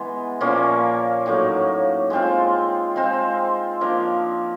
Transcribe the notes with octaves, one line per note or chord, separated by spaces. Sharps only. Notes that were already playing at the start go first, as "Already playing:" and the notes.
Already playing: E3 G#3 B3
A#2 F3 A#3 C#4
A2 F#3 A#3 D#4
G#3 C4 F4
G#3 C4 F4
F3 A#3 D4